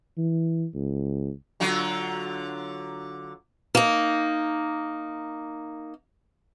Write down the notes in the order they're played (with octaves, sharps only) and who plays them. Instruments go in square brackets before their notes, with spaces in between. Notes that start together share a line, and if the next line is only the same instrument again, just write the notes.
[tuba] E3
C#2
[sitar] D3 F#3 F4
[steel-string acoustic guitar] A#3 D#4